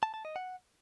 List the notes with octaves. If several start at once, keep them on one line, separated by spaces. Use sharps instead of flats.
A5
A5
D#5
F#5